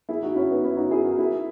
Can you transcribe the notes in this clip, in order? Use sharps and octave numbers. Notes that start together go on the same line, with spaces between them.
E4 G#4
D#4 F#4
C#4 E4
B3 D#4
C#4 E4
D#4 F#4
E4 G#4
F#4 A#4
E4 G#4